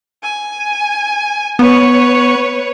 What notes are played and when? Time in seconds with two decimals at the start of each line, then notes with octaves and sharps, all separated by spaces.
0.23 G#5
1.59 B3 B4 C#5